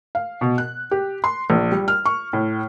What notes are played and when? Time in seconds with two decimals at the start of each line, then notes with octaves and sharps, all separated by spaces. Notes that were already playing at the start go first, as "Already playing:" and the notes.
0.15 F5
0.41 B2
0.58 F#6
0.91 G4
1.24 C6
1.50 A#1
1.72 G3
1.88 F6
2.06 C#6
2.33 A2